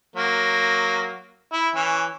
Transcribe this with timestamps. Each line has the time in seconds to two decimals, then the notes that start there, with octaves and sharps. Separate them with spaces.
0.16 F#3 A#3
1.53 E4
1.75 E3 C#4